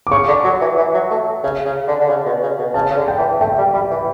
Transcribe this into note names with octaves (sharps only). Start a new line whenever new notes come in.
D6
C#3 C#6
D3
F#3
E3
E3
F#3
A3
C#3
C#3
D3
D3
C#3
B2
C#3
B2
C#3 A5
C#3
D3
G5
E3
A3 G5
G3
G3 B5
E3